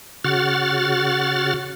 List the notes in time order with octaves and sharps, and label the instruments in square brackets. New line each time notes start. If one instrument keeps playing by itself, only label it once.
[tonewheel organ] C#3 F#4 F#5 F6 A6